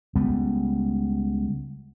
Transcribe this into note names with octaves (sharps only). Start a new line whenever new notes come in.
C#2 G3 B3